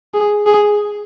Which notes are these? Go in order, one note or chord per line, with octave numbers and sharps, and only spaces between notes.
G#4
G#4